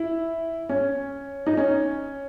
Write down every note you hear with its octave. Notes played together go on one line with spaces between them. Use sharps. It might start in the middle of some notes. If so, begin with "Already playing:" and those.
Already playing: E4
C#4
D#4
C#4